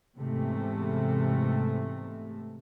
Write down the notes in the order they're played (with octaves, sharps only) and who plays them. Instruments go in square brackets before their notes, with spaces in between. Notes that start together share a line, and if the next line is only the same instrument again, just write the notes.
[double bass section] E2 G#2 C3 A3